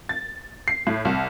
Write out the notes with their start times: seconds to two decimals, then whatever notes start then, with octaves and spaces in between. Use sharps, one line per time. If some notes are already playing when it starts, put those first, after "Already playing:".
0.09 A6
0.68 C7
0.87 A2
1.05 C2